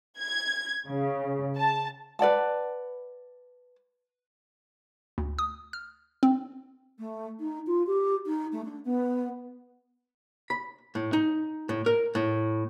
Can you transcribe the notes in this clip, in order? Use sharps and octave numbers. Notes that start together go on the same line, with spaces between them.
G#6
C#3
A5
B4 D5 F#5 A5
D2
D#6
F6
C4
A3
D#4
F4
G4
D#4
A3
D4
B3
B5
A2
D#4
A2
A#4
A2